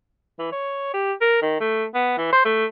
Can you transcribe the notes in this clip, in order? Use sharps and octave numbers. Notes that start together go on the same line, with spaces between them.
E3
C#5
G4
A#4
D#3
A3
B3
E3
C5
A3